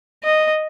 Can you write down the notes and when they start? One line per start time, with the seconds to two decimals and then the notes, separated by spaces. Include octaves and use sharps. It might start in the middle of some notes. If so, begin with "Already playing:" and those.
0.23 D#5